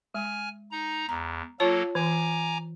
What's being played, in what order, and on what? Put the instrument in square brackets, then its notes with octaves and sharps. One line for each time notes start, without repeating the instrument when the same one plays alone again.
[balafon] G#3 [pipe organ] G#5 F6
[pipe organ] D#4 A#5
[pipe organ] E2 [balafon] A#5
[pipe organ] F#3 A#3 A4 [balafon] F4 C#5 A5
[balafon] E3 [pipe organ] G#5 A#5 D6